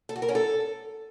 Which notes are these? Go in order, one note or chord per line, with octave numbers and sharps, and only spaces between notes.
A4
F#4
A#4
C#4
A4